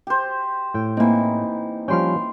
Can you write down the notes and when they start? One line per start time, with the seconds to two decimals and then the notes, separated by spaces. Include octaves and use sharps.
0.07 G4 C5
0.74 A2 G5
0.97 E3 A#3 C4 D#4
1.88 F3 G3 C#4 G5 C6 F6